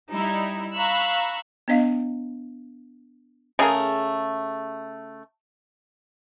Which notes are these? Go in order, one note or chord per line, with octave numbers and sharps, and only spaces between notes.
G3 D#4 E4
F5 A#5 B5 C#6 E6 F#6
B3 D4 D#5 F5
C#3 A3 G#4 A#4